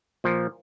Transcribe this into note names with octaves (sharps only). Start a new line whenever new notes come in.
A#2 F3